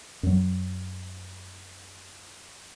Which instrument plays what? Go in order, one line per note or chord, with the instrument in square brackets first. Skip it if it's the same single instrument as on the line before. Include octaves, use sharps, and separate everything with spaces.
[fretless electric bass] F#2 F#3